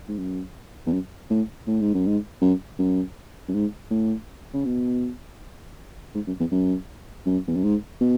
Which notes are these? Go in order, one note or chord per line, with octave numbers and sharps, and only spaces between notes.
G#2
F#2
E2
F#2
A2
A2
G#2
F#2
G#2
F#2
F#2
F#2
G#2
A2
C#3
B2
G#2
F#2
E2
F#2
F#2
E2
F#2
G#2
B2